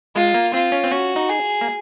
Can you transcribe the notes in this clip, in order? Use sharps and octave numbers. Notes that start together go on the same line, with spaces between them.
G#3 F4
A#3
C4 F4
C#4
C4
C#4 F#4
D#4
G#4
A#3